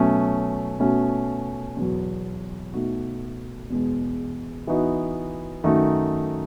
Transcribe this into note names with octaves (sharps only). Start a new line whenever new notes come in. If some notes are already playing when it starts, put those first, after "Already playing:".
Already playing: B2 F#3 A3 C#4
B2 A3 C#4 F#4
E2 B2 F#3
B2 A3 D#4 F#4
E2 B2 G#3
E3 B3 D#4 F#4
F#2 D#3 A3 D#4 F#4